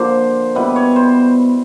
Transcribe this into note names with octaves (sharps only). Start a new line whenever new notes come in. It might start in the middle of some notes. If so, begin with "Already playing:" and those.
Already playing: D3 F3 A#3 C5
B2 G3 B3 E4 B4
C#5
C5